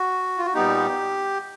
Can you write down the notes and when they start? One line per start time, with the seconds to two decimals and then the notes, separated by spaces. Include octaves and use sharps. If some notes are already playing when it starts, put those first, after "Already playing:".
Already playing: F#4
0.38 F4
0.45 F#4
0.54 A#2 G3 B3 D#4 G4